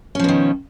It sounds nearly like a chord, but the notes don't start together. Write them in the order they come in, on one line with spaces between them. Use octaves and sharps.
C#4 F3 B2 D#3